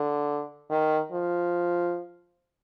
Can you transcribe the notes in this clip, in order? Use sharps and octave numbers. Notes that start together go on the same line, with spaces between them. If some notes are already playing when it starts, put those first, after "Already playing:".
Already playing: D3
D#3
F3